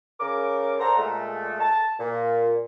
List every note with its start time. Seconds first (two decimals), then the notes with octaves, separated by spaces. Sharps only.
0.20 C#3 A#4 D6
0.80 A4 C5 D5 F#5 A#5
0.96 A#2 G#3 A3
1.60 A5
1.99 A#2